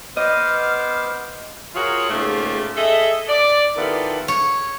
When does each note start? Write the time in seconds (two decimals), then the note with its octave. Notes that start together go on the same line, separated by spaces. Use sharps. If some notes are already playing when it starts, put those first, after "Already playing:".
0.17 B3 C5 D#5 D6 F6
1.75 F4 F#4 G#4 A#4 C#5
2.10 G#2 C#3 A3 A#3 F4 G4
2.76 G#4 A4 D#5 E5
3.28 D5
3.76 D#3 B3 E4 F4 G4 A4
4.28 C#5